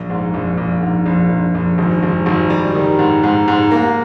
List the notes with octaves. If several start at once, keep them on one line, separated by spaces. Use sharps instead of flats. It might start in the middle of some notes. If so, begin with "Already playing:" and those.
Already playing: A#1
G#2
A#1
A#1
G#2
A#1
A#1
A#1
G#1
G#1
G#1
G3
D#3
G#2
G#2
G#2
A#3